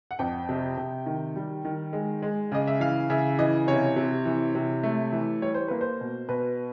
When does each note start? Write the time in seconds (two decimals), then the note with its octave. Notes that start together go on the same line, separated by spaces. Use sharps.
0.11 F#5
0.19 F2 G5
0.49 C3
0.77 C3
1.06 D#3
1.36 G3
1.65 D#3
1.93 G#3
2.22 G#3
2.52 C#3 D#5
2.67 E5
2.80 E3 F5
3.10 C#3 E5
3.39 E3 D#5
3.67 C3 C#5
3.96 C3
4.25 E3
4.55 C3
4.83 A3
5.12 E3
5.42 G3 C#5
5.54 C5
5.68 A#3 B4
5.81 C5
6.01 B2
6.29 B2 B4